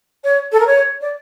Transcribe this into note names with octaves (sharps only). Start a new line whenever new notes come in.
C#5
A4
A#4
C#5
D5